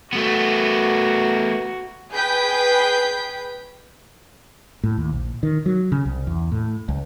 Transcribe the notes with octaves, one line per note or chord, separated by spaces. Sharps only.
A3 B3 F#4
G#4 B4 G5 G6 B6
A2
D#2
A#1
D#3
F#3
C#3
C2
E2
A2
C#2